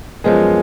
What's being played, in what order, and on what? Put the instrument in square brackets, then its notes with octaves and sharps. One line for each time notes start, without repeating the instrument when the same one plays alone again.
[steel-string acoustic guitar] F#2 F3 B3 [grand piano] G#3